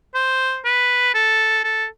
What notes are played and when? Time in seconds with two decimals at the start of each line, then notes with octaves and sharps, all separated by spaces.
0.15 C5
0.65 B4
1.14 A4
1.64 A4